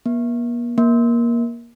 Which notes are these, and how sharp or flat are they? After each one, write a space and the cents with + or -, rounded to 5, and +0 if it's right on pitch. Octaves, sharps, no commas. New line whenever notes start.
A#3 +45
A#3 +20